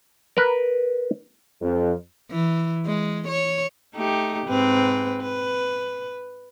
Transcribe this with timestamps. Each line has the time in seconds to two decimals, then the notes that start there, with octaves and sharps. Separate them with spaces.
0.37 A#4 B4
1.62 F2
2.31 E3
2.86 G#3
3.28 C#5
3.94 A3 D#4 G4
4.47 G#2 C4 B4
5.22 B4